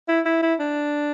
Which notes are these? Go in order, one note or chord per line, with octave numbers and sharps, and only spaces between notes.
E4
E4
E4
D4